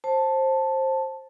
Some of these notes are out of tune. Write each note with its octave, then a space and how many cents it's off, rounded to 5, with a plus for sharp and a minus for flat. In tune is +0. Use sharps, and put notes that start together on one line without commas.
C5 +20 A5 +0